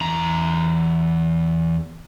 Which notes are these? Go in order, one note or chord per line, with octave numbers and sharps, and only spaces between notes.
E2 A#5